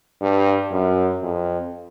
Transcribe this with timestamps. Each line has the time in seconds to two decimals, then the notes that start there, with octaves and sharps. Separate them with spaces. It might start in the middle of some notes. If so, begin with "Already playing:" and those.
0.21 G2
0.72 F#2
1.23 F2